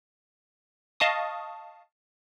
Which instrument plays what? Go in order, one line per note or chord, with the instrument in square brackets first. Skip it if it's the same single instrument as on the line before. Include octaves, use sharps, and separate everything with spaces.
[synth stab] D#5 F5 A5 C#6 D#6